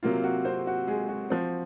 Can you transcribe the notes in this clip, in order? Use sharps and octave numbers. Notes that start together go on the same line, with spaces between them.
C3 F#3 A#3 F4
F#4
C4 C5
F#4
G#3 G#4
F#4
F3 C4